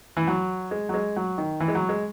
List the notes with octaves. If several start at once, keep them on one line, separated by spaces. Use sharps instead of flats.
E3
F#3
G#3
F#3
G#3
F#3
D#3
E3
G#3
F#3
G#3